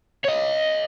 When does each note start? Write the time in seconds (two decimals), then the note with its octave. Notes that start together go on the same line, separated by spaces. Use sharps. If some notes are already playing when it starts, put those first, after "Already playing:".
0.24 C#5 D#5